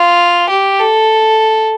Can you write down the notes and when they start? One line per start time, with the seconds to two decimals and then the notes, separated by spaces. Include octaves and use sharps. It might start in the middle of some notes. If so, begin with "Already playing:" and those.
Already playing: F4
0.50 G4
0.79 A4